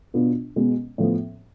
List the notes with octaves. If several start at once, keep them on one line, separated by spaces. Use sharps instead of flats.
B2 B3 D4 F4
B2 G#3 B3
A2 F3 B3